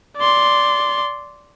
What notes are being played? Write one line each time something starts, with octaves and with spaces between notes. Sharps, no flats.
D5 C6